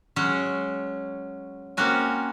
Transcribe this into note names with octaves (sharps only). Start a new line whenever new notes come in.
F#3 G#3 C#4
A#3 C4 C#4 F#4 G#5